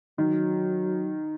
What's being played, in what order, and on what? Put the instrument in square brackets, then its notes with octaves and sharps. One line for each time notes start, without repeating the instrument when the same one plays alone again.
[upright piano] D#3 [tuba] F#3